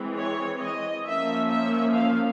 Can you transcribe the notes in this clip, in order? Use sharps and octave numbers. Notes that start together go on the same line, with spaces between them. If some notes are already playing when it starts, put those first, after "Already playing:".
Already playing: E3 G#3 C4
C#5
D#5
F3 A#3 C#4 E5
E5
F5